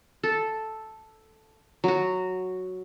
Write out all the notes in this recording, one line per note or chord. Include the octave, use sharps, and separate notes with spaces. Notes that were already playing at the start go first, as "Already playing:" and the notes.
A4
F#3 F#4